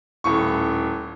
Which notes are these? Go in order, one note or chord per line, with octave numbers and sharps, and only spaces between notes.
D#1 A2 C#6